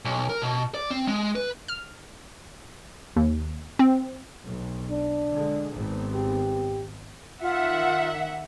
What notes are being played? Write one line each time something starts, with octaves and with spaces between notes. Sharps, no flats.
B1
A#4
B2
D5
C4
G#3
B4
F6
D#2
C4
B1
D4
D3 G#3
G#1 B3 C4
G4
D#3 F4 E5 F#5